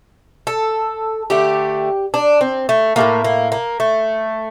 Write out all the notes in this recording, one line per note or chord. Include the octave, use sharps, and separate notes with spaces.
A4
D3 A3 G4
D4
C4
A3
A2 F3 A3 A#3
A#3
A#3
A3